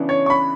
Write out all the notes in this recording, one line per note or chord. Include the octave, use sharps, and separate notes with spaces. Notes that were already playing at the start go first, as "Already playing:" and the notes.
Already playing: C#3 E3 B3 D4
C#5
C#6
B5